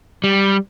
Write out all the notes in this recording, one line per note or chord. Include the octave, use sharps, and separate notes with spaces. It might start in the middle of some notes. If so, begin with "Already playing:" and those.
G3